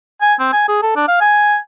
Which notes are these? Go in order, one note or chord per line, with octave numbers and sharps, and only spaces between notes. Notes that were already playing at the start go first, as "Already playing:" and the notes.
G#5
C4
G#5
G#4
A4
D4
F5
G#5